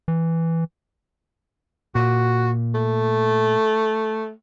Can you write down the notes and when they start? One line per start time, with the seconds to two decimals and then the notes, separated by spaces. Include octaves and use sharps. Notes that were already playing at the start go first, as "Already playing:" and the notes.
0.08 E3
1.95 A#2 F#4
2.75 A3